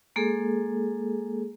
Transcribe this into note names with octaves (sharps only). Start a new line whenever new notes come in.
G#3 A#3 G#4 A4